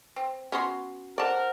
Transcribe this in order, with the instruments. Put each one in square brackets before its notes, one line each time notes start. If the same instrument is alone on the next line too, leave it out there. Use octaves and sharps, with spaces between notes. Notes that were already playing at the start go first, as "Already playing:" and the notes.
[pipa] C4
[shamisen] B3 [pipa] C#4 F#4 C6
[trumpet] A#4 [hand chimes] C5 F#5 [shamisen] D5 A5